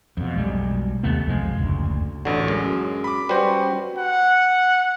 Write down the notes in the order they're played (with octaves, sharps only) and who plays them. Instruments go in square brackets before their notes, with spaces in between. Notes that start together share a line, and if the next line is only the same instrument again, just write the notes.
[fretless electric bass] F2 B2
B1 G3 G#3
D#2 C3 A3 B3
B1 F2 F3 G#3
F#1 D2
[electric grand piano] A1 F#4 [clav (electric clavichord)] D3
[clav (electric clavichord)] F#2 [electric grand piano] G#3
[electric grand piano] B5 D6
[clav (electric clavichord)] G3 C5 [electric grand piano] C#4 F#4 B4
[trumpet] F#5